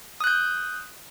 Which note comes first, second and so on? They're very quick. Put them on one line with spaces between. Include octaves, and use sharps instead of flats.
D#6 F#6 G6